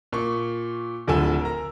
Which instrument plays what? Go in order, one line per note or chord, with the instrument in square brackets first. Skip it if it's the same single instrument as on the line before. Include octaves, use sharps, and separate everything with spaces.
[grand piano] A#2 C#6
D1 D2 F3 A4 G#5 E6
A#4 A#5